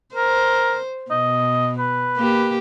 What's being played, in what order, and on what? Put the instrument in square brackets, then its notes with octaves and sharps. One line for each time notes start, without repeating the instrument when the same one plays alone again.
[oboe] A#4 [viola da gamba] C5
[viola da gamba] B2 [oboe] D#5
[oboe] B4
[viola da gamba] A#3 G4